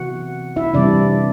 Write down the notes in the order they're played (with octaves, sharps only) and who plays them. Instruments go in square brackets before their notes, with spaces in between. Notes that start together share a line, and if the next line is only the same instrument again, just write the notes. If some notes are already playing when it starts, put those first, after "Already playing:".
Already playing: [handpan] C3 E3 B3 F#4 F#5
E4 E5
C3 E3 G3 C4 D4 D5